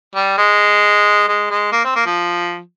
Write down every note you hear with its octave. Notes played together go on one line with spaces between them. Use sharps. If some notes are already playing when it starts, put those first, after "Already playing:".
G3
G#3
G#3
G#3
A#3
C4
A#3
F3